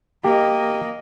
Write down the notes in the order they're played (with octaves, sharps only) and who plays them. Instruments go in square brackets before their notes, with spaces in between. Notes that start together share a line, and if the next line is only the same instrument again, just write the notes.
[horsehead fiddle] A#3 D#5 [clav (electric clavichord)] G4